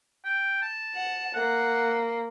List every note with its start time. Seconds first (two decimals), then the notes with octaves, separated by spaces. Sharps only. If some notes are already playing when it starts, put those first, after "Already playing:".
0.24 G5
0.62 A5
0.95 F#5
1.34 A#3 F#5